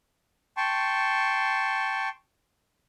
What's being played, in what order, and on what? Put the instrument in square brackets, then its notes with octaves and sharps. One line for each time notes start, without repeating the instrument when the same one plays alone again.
[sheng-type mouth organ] G5 A5 C6 C#6